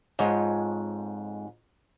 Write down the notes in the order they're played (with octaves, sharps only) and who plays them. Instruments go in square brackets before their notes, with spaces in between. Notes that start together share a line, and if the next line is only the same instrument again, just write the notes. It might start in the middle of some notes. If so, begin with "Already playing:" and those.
[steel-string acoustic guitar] F2 G#2 [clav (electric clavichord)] G#3 F4 C#5